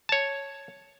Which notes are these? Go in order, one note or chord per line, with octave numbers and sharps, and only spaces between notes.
C#5 A5